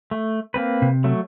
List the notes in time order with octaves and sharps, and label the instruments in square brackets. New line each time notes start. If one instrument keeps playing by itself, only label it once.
[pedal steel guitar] A3
A#3 C4 B4
[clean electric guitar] C3
[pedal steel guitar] F#3 A3